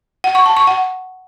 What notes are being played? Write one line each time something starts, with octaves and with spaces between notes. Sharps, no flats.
F#5
C#6
A5
C#6
F#5